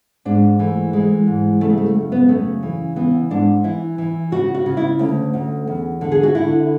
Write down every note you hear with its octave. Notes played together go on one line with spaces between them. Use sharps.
G#2 D4
E3 A3
E3 G#3
G#2
C#3 A3
G#3
A3
F#2
B3
C#3 A3
E3
E3 B3
G#2 D4
E3 E4
E3
C#3 F#4
F#4
C#3
E4
D2 C#4
D2
E2
D3
G#4
F#4
D3 E4